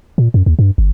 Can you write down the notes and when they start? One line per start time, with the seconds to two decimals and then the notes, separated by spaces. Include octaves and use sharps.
0.18 A#2
0.34 F#2
0.46 D#2
0.59 G2
0.78 G1